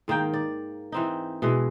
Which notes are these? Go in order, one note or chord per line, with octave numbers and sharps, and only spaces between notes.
G#2 D#3 A#3 G5
D5
E3 C4 D#4
B2 E3 G#3